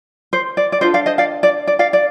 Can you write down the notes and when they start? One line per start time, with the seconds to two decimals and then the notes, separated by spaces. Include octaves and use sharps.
0.33 C5
0.57 D5
0.72 D5
0.81 D4 F4 A4 C5 D#5
0.94 D5 F5
1.06 C5 D#5
1.18 D5 F5
1.43 D5
1.67 D5
1.79 D5 F5
1.93 D5